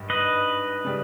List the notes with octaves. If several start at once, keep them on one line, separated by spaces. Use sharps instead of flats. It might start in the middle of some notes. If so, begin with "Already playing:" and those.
Already playing: G#1 G2 G3
B4 D#5
C#3 G3